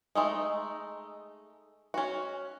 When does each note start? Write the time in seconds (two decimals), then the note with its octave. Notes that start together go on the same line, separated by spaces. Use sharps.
0.15 G#3 A3 D#4
1.94 C#4 F#4